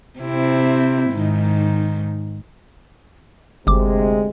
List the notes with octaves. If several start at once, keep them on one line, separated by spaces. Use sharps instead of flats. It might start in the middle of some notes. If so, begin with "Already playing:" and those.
C3 C4 E4
G#2 D#3
G1 D2 C3 G#3 D6